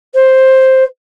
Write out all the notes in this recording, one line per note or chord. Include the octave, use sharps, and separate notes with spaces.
C5